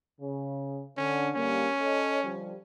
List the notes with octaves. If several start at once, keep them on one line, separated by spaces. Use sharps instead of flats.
C#3
D3 C#4
D3 G3 A#3 C#4
A4 C#5 D#5
D3 F3 G3